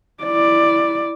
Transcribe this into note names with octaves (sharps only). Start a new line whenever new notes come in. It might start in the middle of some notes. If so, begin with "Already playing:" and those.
E4 D5